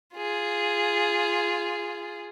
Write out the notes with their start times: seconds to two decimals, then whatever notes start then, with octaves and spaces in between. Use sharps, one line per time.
0.16 F4 G#4